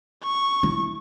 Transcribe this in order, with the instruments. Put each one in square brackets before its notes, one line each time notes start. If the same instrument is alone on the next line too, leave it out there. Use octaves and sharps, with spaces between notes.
[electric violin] C#6
[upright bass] E4